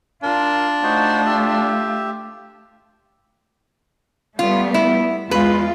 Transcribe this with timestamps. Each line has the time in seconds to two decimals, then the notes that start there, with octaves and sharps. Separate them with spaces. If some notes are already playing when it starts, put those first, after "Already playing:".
0.23 D4 F4 A#4
0.83 A3 D#4 F4 F#4 C5
1.26 G4 E5
4.39 G3 A3 B3 F4
4.74 E4
5.31 E2 G#3 F4 B4